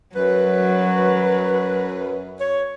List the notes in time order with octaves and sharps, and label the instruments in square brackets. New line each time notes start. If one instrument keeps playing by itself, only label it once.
[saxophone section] F#2 B4 [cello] F#3
[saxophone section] C#5